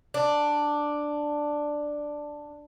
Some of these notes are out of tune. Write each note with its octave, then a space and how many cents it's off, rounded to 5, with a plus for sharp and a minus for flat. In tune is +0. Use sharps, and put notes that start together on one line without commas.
D4 +5